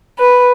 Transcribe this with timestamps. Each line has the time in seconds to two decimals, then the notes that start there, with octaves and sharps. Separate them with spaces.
0.19 B4